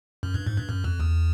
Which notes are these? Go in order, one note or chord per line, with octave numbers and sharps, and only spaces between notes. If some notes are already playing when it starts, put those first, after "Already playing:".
F#2
G2
G#2
G2
F#2
F2
E2